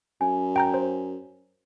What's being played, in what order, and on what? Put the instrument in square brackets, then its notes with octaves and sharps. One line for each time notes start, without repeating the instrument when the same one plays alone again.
[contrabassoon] F#2 [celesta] G#5
[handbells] G5 A#5 G6
C5